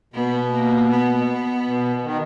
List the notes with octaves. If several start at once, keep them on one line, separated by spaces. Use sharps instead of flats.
B2 B3
A#3
B3
B2
D#3